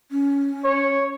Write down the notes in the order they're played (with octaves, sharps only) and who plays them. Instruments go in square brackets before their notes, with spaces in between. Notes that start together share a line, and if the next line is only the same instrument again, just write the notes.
[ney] C#4
[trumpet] C#5